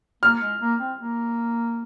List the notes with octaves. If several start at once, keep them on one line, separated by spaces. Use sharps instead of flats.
A#3 F6
G#3
A#3
C4
A#3